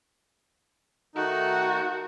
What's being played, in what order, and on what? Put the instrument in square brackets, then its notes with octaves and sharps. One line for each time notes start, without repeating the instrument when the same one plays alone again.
[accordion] D#3 A3 D#4 [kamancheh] F#4